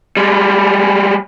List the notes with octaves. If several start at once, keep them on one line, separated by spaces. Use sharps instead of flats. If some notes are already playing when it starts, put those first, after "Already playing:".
G3 G#3